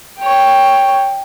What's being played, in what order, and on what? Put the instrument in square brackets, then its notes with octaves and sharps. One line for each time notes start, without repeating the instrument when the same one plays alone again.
[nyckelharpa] C#5 G5